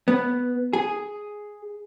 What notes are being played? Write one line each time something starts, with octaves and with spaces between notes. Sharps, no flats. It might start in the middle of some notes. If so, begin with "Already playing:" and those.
B3
G#4